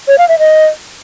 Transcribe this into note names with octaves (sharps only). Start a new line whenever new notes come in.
C#5
F5
E5
D#5